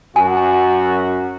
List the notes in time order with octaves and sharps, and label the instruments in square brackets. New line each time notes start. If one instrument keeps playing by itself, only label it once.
[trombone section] F#2 F#4 [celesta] G#5